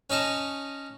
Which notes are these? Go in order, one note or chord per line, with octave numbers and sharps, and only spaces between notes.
C#4 D#4 D#5 A5